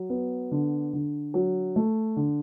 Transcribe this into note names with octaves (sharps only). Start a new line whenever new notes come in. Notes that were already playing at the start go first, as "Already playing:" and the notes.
Already playing: F#3
B3
D3
D3
F#3
A3
D3